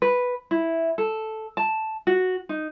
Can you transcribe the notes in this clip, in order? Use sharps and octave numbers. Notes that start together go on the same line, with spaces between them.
B4
E4
A4
A5
F#4
D#4